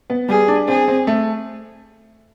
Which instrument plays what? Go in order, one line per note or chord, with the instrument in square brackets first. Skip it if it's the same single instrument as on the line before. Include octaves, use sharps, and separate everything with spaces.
[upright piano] B3
[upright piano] G3 [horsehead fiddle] G#4
[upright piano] D4
[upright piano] C4 [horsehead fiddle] G#4
[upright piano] C4
A3